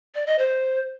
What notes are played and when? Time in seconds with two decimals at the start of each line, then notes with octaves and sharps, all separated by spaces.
0.15 D5
0.27 D#5
0.39 C5